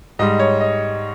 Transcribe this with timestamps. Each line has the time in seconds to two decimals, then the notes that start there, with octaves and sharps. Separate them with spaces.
0.19 G#2 G3 D#5
0.39 C#5
0.60 D#5